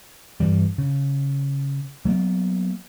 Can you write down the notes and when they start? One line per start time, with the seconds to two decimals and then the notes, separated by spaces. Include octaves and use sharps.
0.40 G2 E3 G3
0.78 C#3
2.05 F#3 G#3 A#3 B3